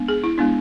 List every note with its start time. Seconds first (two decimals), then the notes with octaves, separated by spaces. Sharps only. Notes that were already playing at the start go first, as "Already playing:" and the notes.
Already playing: G#3 B3 D4
0.08 G#4
0.24 E4
0.38 G#3 B3 D4